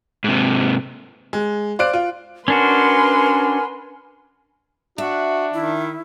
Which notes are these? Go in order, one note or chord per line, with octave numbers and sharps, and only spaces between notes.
G#2 C3
G#3
C5 D5 F5 F#6 D7
F4
C#4 D4 F#4 A#4 B4 F#5 G#5 C6
D4 F#4 E5
D#3 E4